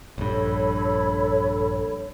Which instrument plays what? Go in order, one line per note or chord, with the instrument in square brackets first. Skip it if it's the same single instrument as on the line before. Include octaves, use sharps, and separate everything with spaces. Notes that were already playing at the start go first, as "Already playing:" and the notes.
[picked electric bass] A#1 G2 [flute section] A4 C#5 B5